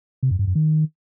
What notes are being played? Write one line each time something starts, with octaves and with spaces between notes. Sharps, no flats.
C3
F#2
G2
F#2
D#3